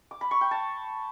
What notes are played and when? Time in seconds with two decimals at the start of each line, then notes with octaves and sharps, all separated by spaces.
0.11 D6
0.21 B5
0.31 C#6
0.41 G5
0.51 A5